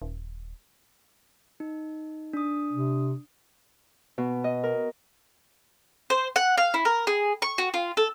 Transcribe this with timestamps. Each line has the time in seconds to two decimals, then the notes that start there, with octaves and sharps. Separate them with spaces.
0.02 D#1
1.60 D#4
2.33 D4 D#6
2.72 C3
4.18 B2
4.44 D#5
4.64 A#4
6.10 C5
6.36 F#5
6.58 F5
6.74 E4
6.85 A#4
7.07 G#4
7.42 C#6
7.58 F#4
7.74 F4
7.97 A4